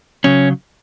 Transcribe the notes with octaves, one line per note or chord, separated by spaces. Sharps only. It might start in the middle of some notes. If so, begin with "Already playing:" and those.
C#3 F#3 C#4